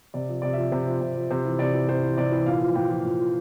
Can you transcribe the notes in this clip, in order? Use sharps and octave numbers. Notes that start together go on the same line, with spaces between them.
C3 D5
F3
C3 D5
F3 E5
C3 C5
F3
C3
F3
C3 C5
E3
C3 D5
E3
C3 C5
E3
C3 D5
E3
A#2 F5
F3
A#2 G5
F3
A#2
F3